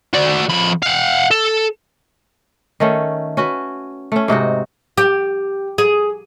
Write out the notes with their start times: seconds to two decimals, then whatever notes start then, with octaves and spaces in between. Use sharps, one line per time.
0.14 F#4 D5
0.49 F2 B5
0.83 F5 F#5
1.31 A4
2.80 D#3 A3 C#4
3.37 C#4 F#4 B4
4.12 A3 C#4
4.28 G#2 C3 D#4 F#4
4.98 G4
5.78 G#4